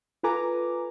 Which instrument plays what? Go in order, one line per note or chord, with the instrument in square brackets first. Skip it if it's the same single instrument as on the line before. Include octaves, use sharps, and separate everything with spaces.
[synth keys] F4 A4 B4 G#5 A#5 D6